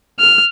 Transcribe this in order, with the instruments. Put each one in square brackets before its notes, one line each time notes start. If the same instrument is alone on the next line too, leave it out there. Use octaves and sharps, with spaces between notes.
[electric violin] F6